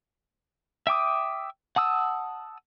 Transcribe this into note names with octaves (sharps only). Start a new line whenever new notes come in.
E5 G5 D6 D#6
F#5 A5 D#6 E6